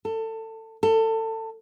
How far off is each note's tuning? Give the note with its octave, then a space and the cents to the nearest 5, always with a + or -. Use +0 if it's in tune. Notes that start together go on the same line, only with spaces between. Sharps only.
A4 +20
A4 +25